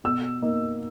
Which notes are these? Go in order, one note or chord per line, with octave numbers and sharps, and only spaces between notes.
B2 E6
A#3 D#4